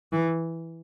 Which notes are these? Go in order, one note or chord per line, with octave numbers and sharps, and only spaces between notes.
E3